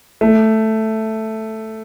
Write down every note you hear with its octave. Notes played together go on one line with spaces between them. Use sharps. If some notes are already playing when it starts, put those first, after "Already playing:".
A3